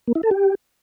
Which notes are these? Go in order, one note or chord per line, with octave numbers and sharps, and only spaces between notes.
A#3
E4
A4
G4